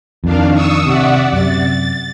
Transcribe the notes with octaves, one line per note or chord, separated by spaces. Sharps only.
F2 D#3 D4 F5
C#6 D#6 E6
C3 D5 E5 F#5
F#2 C3 A6